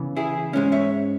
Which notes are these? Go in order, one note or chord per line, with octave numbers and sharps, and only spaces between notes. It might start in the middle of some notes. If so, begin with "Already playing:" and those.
Already playing: C#3 E3 B3
E4 G#4
G#2 G#3 C#4
C#5 E5